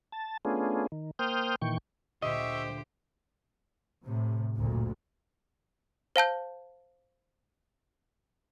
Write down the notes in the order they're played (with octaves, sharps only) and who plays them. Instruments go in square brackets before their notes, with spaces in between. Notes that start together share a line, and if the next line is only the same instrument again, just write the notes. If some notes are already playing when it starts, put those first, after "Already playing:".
[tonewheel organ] A5
A3 B3 C#4 D4 F4 G#4
D#3
A#3 C5 G5 D#6 F6 G6
A#2 D#3 E3 G5 C#6
[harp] D2 A#2 [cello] G4 C5 [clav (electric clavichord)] D#5 [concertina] E5 C#6
[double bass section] A2 C3
F#1 D2 A#2
[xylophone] C5 F5 A5 G6